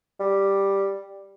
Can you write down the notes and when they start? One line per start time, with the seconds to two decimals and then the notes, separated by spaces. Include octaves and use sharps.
0.20 G3